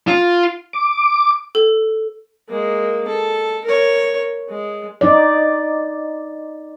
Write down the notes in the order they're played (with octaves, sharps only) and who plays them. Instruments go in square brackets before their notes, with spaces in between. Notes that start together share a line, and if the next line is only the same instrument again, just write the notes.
[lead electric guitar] F4
[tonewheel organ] D6
[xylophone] A4
[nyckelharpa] G#3 A#3
A4
A#4 C#5
G#3
[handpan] D#4 D5